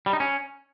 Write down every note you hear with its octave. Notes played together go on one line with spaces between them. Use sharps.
G3
D#4
C#4